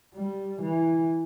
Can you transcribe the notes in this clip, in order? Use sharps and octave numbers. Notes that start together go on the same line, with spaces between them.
G3
E3